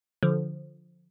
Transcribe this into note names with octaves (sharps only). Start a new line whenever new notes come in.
D3 F3